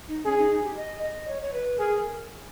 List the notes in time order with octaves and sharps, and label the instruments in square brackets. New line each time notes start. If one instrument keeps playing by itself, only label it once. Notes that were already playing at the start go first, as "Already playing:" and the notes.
[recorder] D#4
[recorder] C#4 [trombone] G#4
[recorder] D#4
D#4
G4
D#5
D#5
C#5
C#5
B4
[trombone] G#4 [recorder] A#4